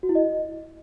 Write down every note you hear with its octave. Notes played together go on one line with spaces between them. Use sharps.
F#4
E4
D#5